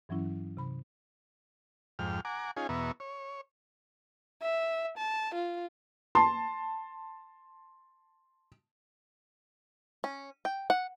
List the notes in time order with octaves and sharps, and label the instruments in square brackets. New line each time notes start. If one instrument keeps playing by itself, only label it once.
[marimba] G2 E3 F#3 C#4 E4
C3 B5
[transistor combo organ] F2 G#2 G5 F6
F#5 G#5 A#5 D6
C#4 D#4 F4 G#4 G#5
E2 B2 B3 E5 A#5 C#6
C#5
[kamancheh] E5
A5
F4
[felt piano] A5 C6
[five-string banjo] C#4
G5
F#5